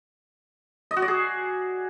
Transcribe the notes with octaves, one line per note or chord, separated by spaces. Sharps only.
D#5
F#4
D5
G#4